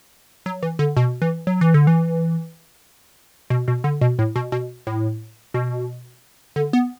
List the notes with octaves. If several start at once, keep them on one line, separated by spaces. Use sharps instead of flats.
F#3
E3
D3
B2
E3
F#3
E3
D3
E3
B2
B2
D3
B2
A2
B2
B2
A2
B2
D3
B3